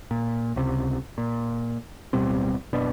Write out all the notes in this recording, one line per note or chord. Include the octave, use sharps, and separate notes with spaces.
A#2
C#2 C3
A#2
D1 B2 G3 C4
F#1 B2 D4